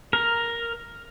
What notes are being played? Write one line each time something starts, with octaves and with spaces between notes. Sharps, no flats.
A#4